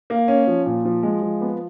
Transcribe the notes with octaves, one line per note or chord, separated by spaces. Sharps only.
A#3
C#4
F3
A#2
F3
G#3
F3
B3